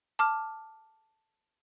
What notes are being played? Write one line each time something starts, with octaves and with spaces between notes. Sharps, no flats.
A5 D6 F6